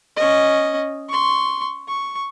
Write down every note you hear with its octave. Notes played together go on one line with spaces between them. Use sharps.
C#4 D#5
C6 C#6
C#6